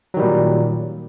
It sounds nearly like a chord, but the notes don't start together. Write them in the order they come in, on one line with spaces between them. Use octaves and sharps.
F#3 D#3 G3 A#2